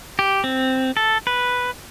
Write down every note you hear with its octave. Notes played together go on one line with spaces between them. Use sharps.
G4
C4
A4
B4